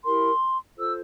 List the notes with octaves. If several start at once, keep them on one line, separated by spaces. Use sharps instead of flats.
E4 G4 A#4 C6
F4 A4 C5 E6